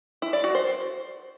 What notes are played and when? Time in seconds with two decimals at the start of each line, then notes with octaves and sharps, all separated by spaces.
0.22 E4
0.33 D5
0.44 F#4
0.55 C5